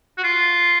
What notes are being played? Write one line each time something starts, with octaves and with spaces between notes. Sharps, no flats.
F#4
F4